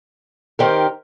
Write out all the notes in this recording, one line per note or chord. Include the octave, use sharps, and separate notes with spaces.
D#3 C4 D#4 G4 A#4